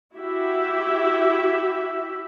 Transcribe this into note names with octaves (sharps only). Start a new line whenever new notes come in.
E4 F#4 G4 E5